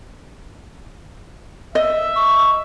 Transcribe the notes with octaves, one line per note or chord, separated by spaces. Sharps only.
D#5 E5
C#6